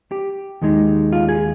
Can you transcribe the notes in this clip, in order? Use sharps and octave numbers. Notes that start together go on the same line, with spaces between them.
G4
D#2 D#3 G#3 D#4
F4
G#4